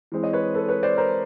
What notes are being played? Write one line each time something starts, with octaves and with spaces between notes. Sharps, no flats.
E3 G#3 C4
C#5 D#5
B4 C#5
A4 B4
B4 C#5
C5 D5
A#4 C5